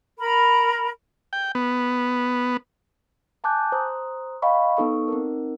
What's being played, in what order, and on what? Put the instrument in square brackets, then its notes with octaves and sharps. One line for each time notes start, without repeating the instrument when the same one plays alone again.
[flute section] A#4 B5
[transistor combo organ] G5
B3
[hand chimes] G#5 A5 D6 F#6 G6
C5 A#5 D#6
D#5 F5 G5 B5 C#6
B3 D#4 A4 C#6
C4 D#4 A#4